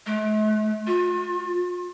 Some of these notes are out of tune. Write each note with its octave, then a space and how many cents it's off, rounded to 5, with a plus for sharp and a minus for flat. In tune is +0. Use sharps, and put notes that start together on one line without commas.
A3 -45
F4 +35